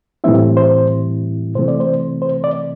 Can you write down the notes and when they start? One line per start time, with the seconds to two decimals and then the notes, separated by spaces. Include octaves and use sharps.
0.24 A2 E3 G3 C4 E4 E5
0.57 C5
1.55 C3 E3 A3 C4 C5
1.68 D5
1.80 C5
2.22 C5
2.44 D5